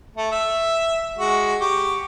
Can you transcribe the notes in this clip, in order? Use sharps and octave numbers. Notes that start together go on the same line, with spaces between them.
A3
E5
G#3 F#4
G4 C#6